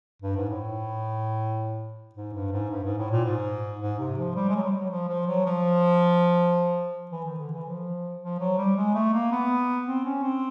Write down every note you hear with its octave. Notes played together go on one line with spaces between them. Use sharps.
G2
G#2
A2
G#2
G2
G#2
G2
G#2
A2
A#2
G#2
G#2
C3
F3
G3
G#3
F#3
G3
F#3
F3
F3
F#3
F3
E3
D#3
D3
E3
F3
F3
F#3
G3
G#3
A3
A#3
B3
C4
C#4
C4